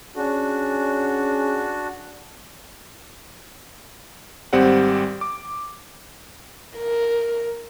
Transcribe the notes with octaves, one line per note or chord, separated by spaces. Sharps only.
C#4 D4 F#4 G#4
G#1 G3 C4 G4 D5 F#5
D6
A#4